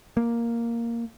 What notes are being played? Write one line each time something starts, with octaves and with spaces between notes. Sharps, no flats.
A#3